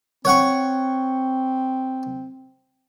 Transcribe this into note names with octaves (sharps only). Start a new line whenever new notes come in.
C4 C#5 F#5 C#6